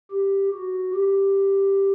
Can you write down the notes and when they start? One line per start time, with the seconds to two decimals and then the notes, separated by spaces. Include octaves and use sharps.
0.11 G4
0.53 F#4
0.95 G4